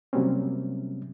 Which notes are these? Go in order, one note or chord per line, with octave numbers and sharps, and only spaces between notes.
C3 F#3 G3 A#3 C4 C#4